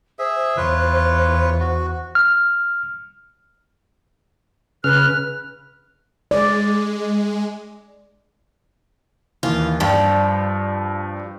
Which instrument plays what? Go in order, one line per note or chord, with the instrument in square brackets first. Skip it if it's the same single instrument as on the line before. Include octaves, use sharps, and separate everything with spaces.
[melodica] G#4 E5 [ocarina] C5
[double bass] E2 [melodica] F4 B4 C#5
[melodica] F#4
[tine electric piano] F6
[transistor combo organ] C#3 F6 [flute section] B4 F#6
[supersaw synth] G#3 [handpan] D5
[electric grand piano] D#2 E3 [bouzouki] F4
[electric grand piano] G2 [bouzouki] F3 G3